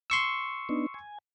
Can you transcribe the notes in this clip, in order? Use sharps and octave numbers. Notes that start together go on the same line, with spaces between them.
C6 C#6 E6
B3 D4 D#4
G#5